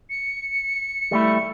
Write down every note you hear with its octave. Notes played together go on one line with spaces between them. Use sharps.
C#7
G3 A3 E4